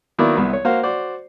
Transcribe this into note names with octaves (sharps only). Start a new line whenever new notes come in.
D#3 F#3 A#3 B3 E4 D5
C2 B3 E4
C#5
A#3 F#4 C5 F5
F#4 C5 D5